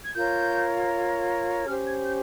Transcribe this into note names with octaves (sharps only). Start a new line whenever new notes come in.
G#6
F4 A#4 C#5 G6
C#4 G4 C5 F6
G#6
G6